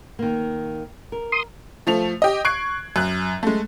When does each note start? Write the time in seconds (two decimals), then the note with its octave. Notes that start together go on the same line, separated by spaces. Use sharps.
0.19 D#3 A#3
1.12 A#4
1.32 C6 D#6
1.87 F3 A3 F7
2.22 G4 D#5
2.45 C#6 F#6 G#6 C7 D7
2.96 F#2 F#6
3.43 G#3 A3